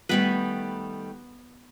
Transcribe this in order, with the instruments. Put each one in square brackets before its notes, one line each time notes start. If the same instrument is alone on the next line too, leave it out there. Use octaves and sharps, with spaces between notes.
[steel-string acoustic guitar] D#3 G3 A3 [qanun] B3 B4